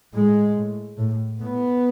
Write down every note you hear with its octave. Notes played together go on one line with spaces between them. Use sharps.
A2 G#3
A2
A2
A2 B3